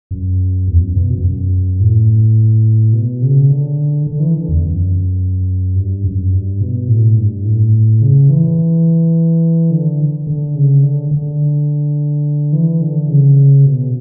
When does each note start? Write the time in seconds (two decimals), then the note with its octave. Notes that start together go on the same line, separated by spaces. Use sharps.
0.11 F#2
0.68 E2
0.81 F#2
0.96 B2
1.11 F#2
1.24 F#2
1.80 A2
2.93 B2
3.22 C#3
3.50 D3
4.07 D3
4.20 E3
4.35 D3
4.49 E2
4.63 F#2
5.75 G2
6.04 F#2
6.32 G2
6.61 B2
6.88 A2
7.17 G2
7.45 A2
8.02 C#3
8.30 E3
9.71 D3
10.27 D3
10.55 C#3
10.83 D3
11.11 D3
12.53 E3
12.82 D3
13.09 C#3
13.66 B2